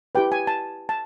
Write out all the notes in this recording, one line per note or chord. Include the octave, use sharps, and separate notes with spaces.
E4 G4 B4 G5
G#5
A5
A5